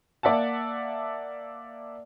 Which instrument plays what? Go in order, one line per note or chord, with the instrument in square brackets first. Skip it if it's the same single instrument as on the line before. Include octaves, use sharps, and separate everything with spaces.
[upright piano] A#3 D5 E5 F#5 A5